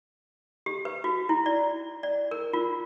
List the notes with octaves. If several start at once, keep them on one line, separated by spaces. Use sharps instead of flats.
G4
B4
F#4
E4
D5
D5
A#4
F4